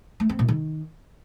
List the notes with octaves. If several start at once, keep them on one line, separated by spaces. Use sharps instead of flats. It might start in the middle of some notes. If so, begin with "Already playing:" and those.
A3
C4
A#2
D#3